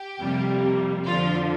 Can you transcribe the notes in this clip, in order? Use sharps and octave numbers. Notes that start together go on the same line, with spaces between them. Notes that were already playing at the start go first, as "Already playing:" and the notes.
Already playing: G4
F2 C3 G3 A#3
F2 D3 F3 F4